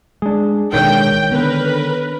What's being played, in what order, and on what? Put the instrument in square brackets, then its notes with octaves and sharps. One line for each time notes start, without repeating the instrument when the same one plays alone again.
[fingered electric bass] G#3 [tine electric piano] D4 G#4
[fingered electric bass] A1 B2 D4 [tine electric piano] D#3 C#5 [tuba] G#3 [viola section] G5
[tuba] D3 [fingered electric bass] B3 [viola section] A#4 B4